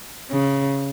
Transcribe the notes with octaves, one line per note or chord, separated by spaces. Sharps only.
C#3